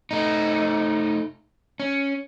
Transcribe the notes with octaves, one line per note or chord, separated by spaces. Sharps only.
A3 D#4
C#4